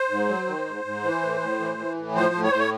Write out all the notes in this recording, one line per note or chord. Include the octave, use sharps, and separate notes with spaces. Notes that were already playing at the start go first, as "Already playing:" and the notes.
Already playing: C5
G#2
F#3
D#3
G#2
G#2
E3
A2
A2
E3
E3
A2
F3 C5
A2
C#5
A2 C5
C#5